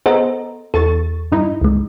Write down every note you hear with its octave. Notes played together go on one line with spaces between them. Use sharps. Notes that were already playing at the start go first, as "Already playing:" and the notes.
B3 G#4 A4 C5 D#5 A#5
E2 A4 C#6 A6
G2 D#4 E4
C#2 G#3